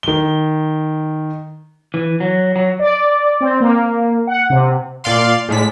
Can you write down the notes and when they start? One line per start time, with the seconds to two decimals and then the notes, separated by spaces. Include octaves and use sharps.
0.03 D#3 G7
1.94 E3
2.20 F#3
2.56 F#3
2.79 D5
3.41 C4
3.60 A#3
4.27 F#5
4.50 C3
5.04 A#2 D5 F5 C6
5.49 A2 G#3 D4 B6